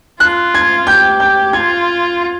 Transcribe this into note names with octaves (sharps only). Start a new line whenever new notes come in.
F4 F#6
G#6
G4 G6
G6
F4 G#6